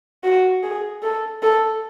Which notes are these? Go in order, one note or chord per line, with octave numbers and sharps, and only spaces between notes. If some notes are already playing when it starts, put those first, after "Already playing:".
F#4
G#4
A4
A4